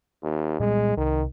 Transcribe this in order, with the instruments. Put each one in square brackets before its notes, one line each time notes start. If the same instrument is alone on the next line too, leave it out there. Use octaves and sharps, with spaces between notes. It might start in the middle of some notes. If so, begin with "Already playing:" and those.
[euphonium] D#2
[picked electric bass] A#2 G3 B3 [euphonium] G#3
[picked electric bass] C2 [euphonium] D#3